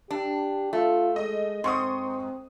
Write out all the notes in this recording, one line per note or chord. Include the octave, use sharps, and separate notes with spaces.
D4 G4
A3 F4
G#3 D#5
G#2 C4 C6 C#6 D#6